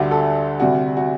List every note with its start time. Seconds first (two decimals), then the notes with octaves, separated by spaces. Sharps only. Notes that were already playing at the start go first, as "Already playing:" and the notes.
Already playing: D2 D3 G3 F#4
0.11 A4
0.60 D2 C3 G3 F#4
0.97 F#4